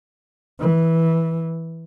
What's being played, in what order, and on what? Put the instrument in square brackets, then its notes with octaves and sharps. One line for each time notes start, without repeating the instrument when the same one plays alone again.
[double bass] E3